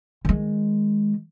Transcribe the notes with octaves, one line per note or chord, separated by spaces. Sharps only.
D#3 G#3